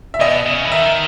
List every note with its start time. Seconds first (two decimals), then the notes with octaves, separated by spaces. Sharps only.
0.14 E5
0.20 B2 D#5
0.46 C#3
0.65 E3
0.71 D#3 E5